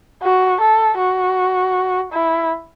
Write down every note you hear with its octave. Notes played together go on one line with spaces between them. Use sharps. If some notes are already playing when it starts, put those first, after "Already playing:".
F#4
A4
F#4
E4